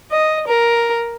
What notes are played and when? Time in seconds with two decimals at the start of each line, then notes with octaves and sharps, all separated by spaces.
0.12 D#5
0.47 A#4